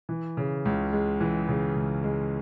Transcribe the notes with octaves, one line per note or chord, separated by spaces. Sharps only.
E3
C#3
C#2
G#3
E3
C#3
C#2
G#3